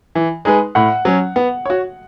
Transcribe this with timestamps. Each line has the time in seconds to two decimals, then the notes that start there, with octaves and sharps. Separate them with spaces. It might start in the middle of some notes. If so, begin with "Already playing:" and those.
0.15 E3
0.45 G#3 D#4 G#4 B4
0.75 A2 F#5
1.05 F#3 C#4
1.36 B3 F#5
1.66 F#4 C#5